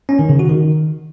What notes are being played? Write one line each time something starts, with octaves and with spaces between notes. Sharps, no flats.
C#4
D#3
C#3
F#4
D#3